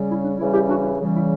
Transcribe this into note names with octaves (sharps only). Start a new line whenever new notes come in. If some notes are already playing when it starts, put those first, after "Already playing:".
Already playing: C#3 G3
E4
D4
C#3 E3 G3 E4
E4 G4
D4 F#4
E4
C#3 E3 G3
E4